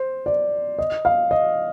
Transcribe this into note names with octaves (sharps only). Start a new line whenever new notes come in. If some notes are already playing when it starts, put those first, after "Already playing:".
Already playing: C5
D5
D#5
F5
D#5